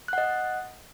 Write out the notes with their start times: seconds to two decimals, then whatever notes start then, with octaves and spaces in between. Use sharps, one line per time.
0.08 F#6
0.13 F#5
0.18 D#5